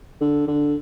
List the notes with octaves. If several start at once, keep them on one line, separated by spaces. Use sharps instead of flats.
D3
D3